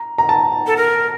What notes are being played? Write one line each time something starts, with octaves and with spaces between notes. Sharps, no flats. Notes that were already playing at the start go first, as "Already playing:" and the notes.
Already playing: A#5
A#5
A5
A4
A#4